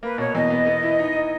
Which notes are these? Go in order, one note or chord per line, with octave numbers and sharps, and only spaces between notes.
A#3 B4
B2 C#5
E2 D#5
B3
B3
E4
D#4
D#4